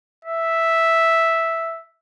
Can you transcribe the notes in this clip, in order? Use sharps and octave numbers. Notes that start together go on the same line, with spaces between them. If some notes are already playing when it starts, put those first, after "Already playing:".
E5